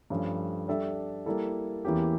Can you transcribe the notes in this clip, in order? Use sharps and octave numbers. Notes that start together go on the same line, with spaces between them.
G2 F3 A3 C#4
G3 D4 A4 E5
G3 A#3 E4 A4
E2 E3 A#3 C#4 G4